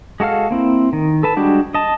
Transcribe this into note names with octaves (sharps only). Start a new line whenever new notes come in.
G#3 F#4 A4 F5 F6
A#3 C4 E4
D#3
A4 B4 A5
G3 G#3 D4 F#4 G4
D#5 A5